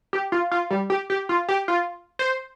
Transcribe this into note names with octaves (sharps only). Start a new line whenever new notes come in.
G4
F4
F4
G3
G4
G4
F4
G4
F4
C5